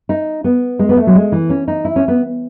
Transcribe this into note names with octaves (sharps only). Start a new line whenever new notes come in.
D#4
B3
G#3
B3
A3
F#3
G#3
E3
C#4
D#4
E4
C#4
B3